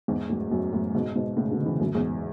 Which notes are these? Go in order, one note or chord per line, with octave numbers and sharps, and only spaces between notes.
E2 G#2
F#2 A2
F#2 A2
F#2 A2
G#2 B2
G#2 B2
A2 C#3
B2 D3
C#3 E3
F#2 A2
E2 G#2